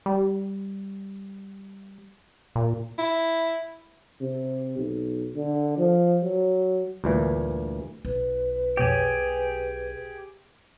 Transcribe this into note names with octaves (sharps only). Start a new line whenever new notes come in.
G3
A#2
E4
C3
B1
D3
F3
F#3
D2 G2 A#2 E3
B1 B4
F2 B2 G4 G#4 C#5